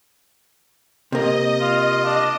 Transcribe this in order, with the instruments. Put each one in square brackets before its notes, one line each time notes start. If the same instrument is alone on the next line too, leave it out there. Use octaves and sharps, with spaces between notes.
[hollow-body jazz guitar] C3 A#3 [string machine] D#5
[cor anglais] F4
D4